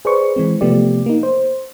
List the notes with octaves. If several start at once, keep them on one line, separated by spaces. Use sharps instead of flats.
G#4 B4 C5 D5 C#6
E3 G#3 C4
C3 F3 A3 B3 G4 D5
A#3 D#4
C5